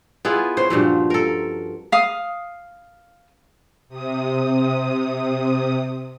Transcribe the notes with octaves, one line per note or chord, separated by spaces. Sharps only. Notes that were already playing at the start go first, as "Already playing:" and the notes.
B3 E4 F4 G#4
C#4 C5
G2 A#2 F3 F#3
A4 A#4
F5 D#6
C3 D#6